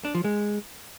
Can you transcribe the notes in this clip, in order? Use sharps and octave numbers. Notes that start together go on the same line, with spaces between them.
D4
F3
G#3